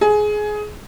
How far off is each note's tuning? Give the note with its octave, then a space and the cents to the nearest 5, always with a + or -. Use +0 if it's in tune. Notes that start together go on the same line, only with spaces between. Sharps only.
G#4 +15